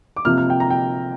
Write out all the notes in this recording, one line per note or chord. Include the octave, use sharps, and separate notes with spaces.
D6
C3 F3 A#3 F6
F6
G5
A#5
G5